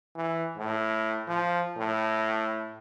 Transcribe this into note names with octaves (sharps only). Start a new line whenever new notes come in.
E3
A2
F3
A2